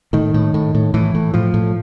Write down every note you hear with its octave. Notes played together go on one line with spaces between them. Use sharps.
A2 D#3
A2
A2
A2
A2 E3
A2
A2 F3
A2